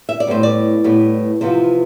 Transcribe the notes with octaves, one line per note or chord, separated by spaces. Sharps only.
E5
D5
A2 G3 B3 C5
D5
A2 G3 B3
E2 C3 F3 B3 F4 C5